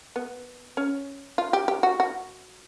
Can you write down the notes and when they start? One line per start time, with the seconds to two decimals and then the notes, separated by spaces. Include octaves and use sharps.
0.16 B3
0.77 C#4
1.38 F4
1.53 G4
1.68 G4
1.83 F#4
2.00 F#4